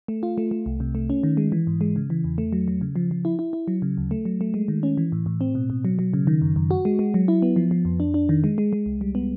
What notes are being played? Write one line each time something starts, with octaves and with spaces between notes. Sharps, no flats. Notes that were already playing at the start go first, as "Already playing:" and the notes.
A3
F4
A3
A3
C2
C3
A3
C#4
D#3
G#3
E3
G#2
G#3
C#3
E3
E2
A3
F#3
F#3
C#3
F3
F3
E4
E4
E4
F#3
C#3
D2
A3
F#3
A3
G#3
D#3
C#4
E3
A2
A2
C4
B2
B2
F#3
F#3
C#3
D#3
F#2
F#2
F#4
G#3
G#3
F#3
E4
B3
F3
F3
F2
D4
D4
D#3
G#3
G#3
G#3
C2
G3
B3